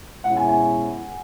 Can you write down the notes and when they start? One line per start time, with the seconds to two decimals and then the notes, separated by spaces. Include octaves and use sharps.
0.24 B2 G#3 C#4 E4 F#5
0.37 G#5
0.48 G#5